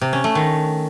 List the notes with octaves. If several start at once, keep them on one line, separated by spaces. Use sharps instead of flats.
C3
C#4
A3
D#3